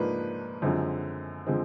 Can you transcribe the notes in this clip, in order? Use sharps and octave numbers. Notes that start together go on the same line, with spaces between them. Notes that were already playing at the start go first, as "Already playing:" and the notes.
Already playing: G#2 F3 A#3 D4 B4
F#2 D3 F3 G#3 C4
D3 F3 G#3 C4